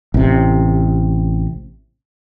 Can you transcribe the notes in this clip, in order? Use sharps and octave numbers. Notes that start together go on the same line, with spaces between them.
A1 C3